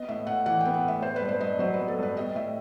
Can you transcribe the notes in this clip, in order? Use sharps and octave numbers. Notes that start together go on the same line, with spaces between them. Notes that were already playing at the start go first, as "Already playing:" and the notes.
Already playing: B3 D#5
A2 E5
A2 F#5
E3 F#5
G5
B3
F#5
A2 E5
B3 C5
B4
G2
C5
G2 D#5
F#3 C5
B4
B3
A4
G2
B4
G3 D#5
A2 E5